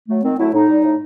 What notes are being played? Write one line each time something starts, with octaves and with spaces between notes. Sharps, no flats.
F#3 A3
D#3 C4
F#3 A3 E4
A2 D#4
G3
A2